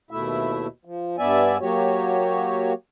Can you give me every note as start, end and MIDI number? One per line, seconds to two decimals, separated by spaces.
0.11 0.67 39
0.11 0.67 47
0.11 0.67 57
0.11 0.67 64
0.11 0.67 76
0.85 1.16 53
1.18 1.57 43
1.18 1.57 59
1.18 1.57 74
1.18 1.57 76
1.18 1.57 80
1.61 2.73 54
1.61 2.73 58
1.61 2.73 66
1.61 2.73 67
1.61 2.73 73